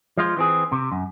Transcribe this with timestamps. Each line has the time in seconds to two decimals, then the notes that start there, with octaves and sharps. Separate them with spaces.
0.17 F3 G#3 F4
0.37 E3 C4 G#4
0.72 C3
0.92 F#2